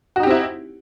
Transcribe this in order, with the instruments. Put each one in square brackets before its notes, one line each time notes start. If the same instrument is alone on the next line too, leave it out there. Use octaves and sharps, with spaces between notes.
[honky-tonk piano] F#4
D#4
G4
C4
E4